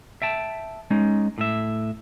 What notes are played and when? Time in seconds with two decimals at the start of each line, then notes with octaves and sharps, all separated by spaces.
0.22 E5 G5 A5
0.91 G#3 C#4 D#4
1.38 A2 E5